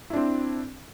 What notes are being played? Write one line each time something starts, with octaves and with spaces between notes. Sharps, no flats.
C4 D4 E4